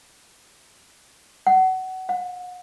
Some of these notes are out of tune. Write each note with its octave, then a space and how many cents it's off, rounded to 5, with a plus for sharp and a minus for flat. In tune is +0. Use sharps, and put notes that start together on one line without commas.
F#5 +20
F#5 -40